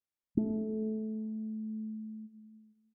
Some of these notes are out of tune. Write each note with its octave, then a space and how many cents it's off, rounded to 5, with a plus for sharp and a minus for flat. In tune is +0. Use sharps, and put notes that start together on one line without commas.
A3 -20